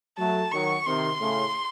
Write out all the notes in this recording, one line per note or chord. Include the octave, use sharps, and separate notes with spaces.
F#3 A3 A5
D#3 F#3 C#6
C3 D#3 C6
A2 C#3